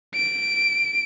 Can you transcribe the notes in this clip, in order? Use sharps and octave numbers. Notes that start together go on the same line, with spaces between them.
D7